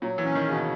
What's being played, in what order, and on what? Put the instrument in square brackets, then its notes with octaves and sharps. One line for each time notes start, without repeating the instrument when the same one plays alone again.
[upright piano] A#2 [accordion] F#3
[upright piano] E3
[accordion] C#4
[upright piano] D#3
[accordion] C#3
[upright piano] B2